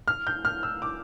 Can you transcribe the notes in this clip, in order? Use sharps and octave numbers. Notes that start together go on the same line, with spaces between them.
F6
G6
F6
E6
D6